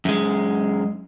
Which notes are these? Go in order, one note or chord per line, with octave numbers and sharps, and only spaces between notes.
F#2 G#3